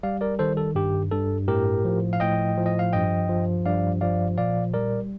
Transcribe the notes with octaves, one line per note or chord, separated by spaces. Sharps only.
G3 D5 F5
A#4 D5
D#3 A4 C5
A4
G2 G4
G2 A4
A2 G4 A#4
F3
F5
A2 D#5 G5
F3
D#5
F5
G2 D#5 G5
F3
G2 D5 F5
F3 D5 F5
A#2 D5 F5
G3 A#4 D5